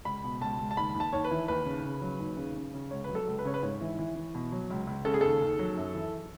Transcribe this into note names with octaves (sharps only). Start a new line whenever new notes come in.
C#2 B5
B2
C#2 A5
C#2
A5
D#2 B5
D#2
A5
D#2 C#5
B4
E3
D#2 B4
C#3
C#3
F#3
D#2
C#3
C#3
C#3
C#2 C#5
F#3 B4
A4
C#2
B4
C#3 C#5
B4
G#2 C#5
E3
E3
E3
B2
F#3
C#2
C#2
C#3 A4
G#4
D#2 A4
D#2
F#3
F#2
E3